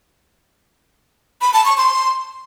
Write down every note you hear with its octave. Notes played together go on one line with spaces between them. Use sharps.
B5
A5
C#6
C6